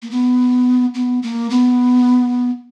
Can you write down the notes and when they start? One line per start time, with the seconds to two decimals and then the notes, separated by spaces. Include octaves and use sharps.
0.03 A#3
0.11 B3
0.94 B3
1.23 A#3
1.50 B3